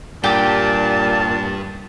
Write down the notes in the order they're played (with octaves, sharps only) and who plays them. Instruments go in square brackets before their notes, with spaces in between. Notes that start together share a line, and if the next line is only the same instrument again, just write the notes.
[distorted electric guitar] G2 [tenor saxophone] A#2 [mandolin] G4 [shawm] A5